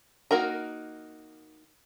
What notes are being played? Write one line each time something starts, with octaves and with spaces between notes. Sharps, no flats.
A#3 D#4 F#4 A#4 A#5